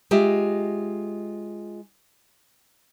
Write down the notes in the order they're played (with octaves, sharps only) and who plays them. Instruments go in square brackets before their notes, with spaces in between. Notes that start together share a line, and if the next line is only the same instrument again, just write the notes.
[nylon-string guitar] G#3 F4 G4 D#5 E5